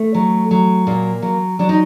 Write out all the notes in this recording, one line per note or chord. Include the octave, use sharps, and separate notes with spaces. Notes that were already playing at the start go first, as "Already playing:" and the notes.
Already playing: A3
F#3
F#3
A#2 A#3
F#3
F#3 D4
D#4